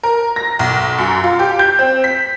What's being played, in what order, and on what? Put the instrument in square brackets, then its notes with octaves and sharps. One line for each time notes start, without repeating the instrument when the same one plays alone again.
[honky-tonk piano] A#4
A#6
B1
F#2
F4
G4
G6
C4
B6